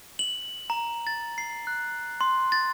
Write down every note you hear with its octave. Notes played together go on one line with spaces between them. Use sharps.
F#7
A#5
A6
C7
F#6
C6
A6